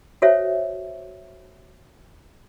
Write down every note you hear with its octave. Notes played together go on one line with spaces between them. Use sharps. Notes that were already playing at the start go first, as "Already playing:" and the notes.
F#4 A4 C5 C#5 E5